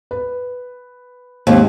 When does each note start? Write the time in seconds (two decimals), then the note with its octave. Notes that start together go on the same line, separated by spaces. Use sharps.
0.11 B4
1.47 D#2 G#2 C4